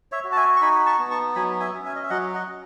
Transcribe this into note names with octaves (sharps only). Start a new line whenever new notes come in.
C#5 E5
F#4
A5
E5 G#5
C#6
D#4 G#5 B5
A5 C#6
B3
A5 C#6
F#3 G#5 B5
E5 G#5
C#4
E5 G#5
D#5
E5
F#3 D#5 F#5
D#5 F#5
C#4